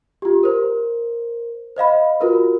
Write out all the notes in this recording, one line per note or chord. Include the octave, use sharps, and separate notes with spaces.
F4 G4
A#4 C5
C5 D#5 F5 B5
F4 F#4 A#4 B4